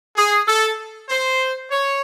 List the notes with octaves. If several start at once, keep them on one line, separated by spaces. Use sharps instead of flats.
G#4
A4
C5
C#5